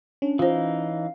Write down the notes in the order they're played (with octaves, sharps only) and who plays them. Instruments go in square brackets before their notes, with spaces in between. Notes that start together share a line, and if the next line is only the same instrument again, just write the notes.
[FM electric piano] C#4 [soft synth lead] D4
[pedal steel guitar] E3 D#4 [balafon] F4 C5 [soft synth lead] F5